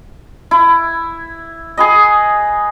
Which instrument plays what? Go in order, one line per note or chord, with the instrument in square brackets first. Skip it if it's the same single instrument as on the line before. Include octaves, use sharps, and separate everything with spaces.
[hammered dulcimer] E4
G#4 B4 D#5